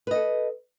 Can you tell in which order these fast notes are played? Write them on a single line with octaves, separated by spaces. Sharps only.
B4 D#5 A4